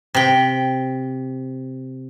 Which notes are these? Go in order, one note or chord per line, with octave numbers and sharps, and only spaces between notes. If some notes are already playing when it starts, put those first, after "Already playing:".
C3 G5